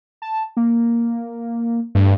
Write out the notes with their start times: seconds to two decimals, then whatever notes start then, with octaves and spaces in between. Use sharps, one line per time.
0.22 A5
0.57 A#3
1.95 G2 A3